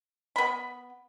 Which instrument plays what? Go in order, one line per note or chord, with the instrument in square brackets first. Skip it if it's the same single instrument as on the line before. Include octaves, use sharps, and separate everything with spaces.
[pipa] B3 B5